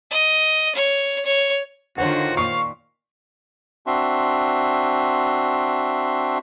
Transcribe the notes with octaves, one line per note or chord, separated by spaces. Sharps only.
D#5
C#5
C#5
D3 D#3 F4 F#4 C5 C#5 F#5
A#2 F5 C#6
C4 D4 F#4 E5 C6